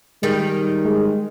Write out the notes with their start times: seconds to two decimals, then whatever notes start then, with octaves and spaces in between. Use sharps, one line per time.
0.23 D#3 G3 G#3
0.85 G#3